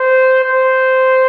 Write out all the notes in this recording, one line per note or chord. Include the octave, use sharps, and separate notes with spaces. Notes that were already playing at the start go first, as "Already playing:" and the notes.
Already playing: C5
C5